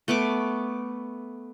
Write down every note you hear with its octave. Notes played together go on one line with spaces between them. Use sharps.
A3 B3 C#6 D6